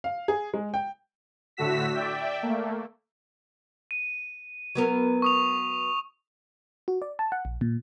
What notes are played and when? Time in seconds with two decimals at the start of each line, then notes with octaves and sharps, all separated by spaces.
0.04 F5
0.28 G#4
0.54 G#3
0.74 G5
1.57 A2 D3 A3 F#4 E6 B6
1.95 D5 E5 G5
2.43 A3 A#3
3.91 D#7
4.75 F#3 B3 A#4
5.22 C#6 D#6 F7
6.88 F#4
7.02 D5
7.19 A5
7.32 F#5
7.45 A#1
7.61 A#2